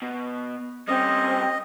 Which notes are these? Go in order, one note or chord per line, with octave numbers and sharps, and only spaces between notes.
B2
G3 C4 C#4 D#5